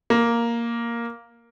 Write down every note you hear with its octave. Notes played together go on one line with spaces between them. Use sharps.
A#3